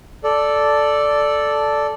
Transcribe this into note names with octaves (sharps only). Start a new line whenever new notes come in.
A4 D5